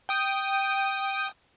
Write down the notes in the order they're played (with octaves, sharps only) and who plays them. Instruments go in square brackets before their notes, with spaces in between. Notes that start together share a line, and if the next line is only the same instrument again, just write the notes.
[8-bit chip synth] G5 D#6